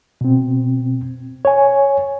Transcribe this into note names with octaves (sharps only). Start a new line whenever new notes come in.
B2 C4
C#5 G#5